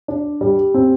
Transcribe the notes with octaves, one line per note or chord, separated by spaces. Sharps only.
D4
G3
C4